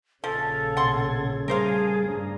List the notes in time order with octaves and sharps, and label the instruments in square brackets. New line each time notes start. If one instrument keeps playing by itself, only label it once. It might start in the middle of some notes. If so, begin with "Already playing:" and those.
[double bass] A#1 C#3 [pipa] F3 [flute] A4 [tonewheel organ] F5 G#5
[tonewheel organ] B2 G#6 [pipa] F#5 C6
[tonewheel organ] G3 A3 A5 [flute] G#4 [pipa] A#4 C5 F5
[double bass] G2 D4 [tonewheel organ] A#5